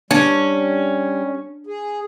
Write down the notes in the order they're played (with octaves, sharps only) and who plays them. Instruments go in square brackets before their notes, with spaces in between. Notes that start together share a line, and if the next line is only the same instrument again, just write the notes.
[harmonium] G3 [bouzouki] C#4 [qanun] D4
[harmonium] G#4